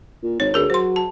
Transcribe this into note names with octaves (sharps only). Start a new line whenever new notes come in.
A#2
G#1 C#5
D2 G#4 A#4
F#3 C5 C6
A5